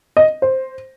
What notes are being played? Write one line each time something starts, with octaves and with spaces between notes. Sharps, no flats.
D#5
C5